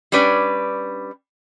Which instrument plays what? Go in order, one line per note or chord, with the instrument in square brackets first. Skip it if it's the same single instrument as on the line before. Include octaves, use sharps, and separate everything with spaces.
[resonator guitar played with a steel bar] G3 C#4 D4 B4 D5